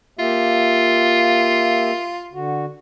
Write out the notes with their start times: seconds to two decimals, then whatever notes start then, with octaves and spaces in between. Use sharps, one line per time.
0.19 A#3 F4 G4 E5
2.34 D3 F#4